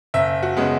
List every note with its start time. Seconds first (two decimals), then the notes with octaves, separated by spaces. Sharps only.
0.14 F#1 E5
0.43 F#4
0.57 C#3 G#3 B3